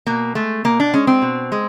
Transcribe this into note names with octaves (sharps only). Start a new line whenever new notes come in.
B2 A#3
G#3 A3
B2 A#3
D4
G#3 C#4
C4
B2
G#3